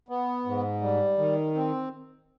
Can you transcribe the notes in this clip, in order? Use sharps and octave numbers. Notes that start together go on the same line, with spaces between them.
B3
G#2
G3
D#3
C4